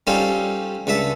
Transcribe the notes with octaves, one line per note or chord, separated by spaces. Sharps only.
G3 C#4 D#4 F4 A4 C5
C#2 D3 A4 E5